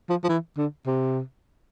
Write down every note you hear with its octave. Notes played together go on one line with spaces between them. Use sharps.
F3
F3
E3
D3
C3